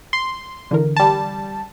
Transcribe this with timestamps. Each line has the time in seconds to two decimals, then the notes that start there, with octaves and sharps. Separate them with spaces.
0.13 C6
0.71 D3 E3 A#4
0.97 G3 A5